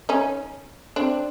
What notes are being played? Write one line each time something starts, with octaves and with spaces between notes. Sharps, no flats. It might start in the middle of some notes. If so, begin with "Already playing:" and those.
C#4 D#4
C4 D4